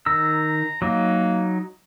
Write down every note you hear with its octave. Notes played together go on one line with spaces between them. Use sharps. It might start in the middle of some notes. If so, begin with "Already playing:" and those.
D#3 A#5 E6
F#3 A#3 D#4